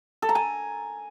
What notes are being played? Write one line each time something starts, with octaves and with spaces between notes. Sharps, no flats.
A4
A#5
G#5